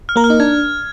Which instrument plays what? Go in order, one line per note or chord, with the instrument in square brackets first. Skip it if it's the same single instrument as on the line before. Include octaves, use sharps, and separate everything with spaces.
[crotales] F6
[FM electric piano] A#3 A#4
[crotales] F6
[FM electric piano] D#4
[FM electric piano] D4 [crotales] G#6